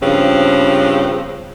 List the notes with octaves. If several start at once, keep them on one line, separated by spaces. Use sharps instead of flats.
G2 C#3 F3 B3 C4